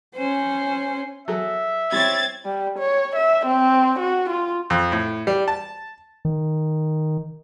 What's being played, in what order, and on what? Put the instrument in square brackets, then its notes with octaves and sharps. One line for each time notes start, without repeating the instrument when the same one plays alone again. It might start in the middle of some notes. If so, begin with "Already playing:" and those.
[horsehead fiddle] C#4 C5
[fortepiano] F#3 G#4 A4 [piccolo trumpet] E5
[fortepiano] G3 E4 C#5 [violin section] C4 G#6 A6
[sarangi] G3
C#5
E5
C4
F#4
F4
[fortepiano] F2
A2
G3
A5
[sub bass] D#3